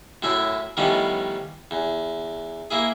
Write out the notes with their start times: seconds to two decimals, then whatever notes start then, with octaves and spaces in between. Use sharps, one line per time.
0.22 F#2 A2 E4 E5
0.77 A2 D#3 F3 G3 B3 C#4
1.71 E2
2.71 A#3 E4 G#4